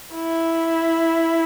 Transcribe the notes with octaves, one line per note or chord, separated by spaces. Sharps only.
E4